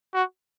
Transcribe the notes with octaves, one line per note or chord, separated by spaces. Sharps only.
F#4